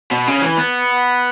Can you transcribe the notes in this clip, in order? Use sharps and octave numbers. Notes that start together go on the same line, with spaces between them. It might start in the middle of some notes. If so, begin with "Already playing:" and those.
B2
C#3
E3
B3